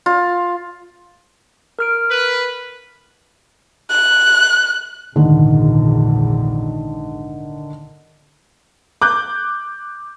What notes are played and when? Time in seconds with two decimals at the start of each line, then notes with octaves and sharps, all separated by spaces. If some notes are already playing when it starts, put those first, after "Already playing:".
0.06 F4
1.79 A#4 F6 D7
2.10 B4
3.90 F#6
5.16 A#1 E2 G#2 D3 D#3
9.02 D6 F#6 G6